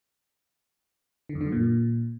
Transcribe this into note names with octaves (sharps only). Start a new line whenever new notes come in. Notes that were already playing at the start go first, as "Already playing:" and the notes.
D3
F2
D3
F#2
A#2